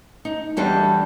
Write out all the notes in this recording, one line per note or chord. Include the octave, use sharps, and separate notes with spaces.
D#4
E2 G3 D4 G4 A4